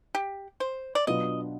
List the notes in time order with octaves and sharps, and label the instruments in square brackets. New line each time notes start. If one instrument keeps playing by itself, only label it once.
[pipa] G4
C5
D5
[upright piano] B2 F#3 B3 D4 F4 [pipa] D#5